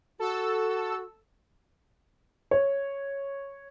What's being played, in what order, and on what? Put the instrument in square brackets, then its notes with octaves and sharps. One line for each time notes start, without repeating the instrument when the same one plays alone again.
[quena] F#4 [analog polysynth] A4 E6
[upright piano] C#5